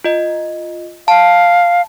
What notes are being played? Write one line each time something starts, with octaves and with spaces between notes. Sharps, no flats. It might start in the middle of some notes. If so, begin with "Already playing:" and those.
F4 D#5
F5 A5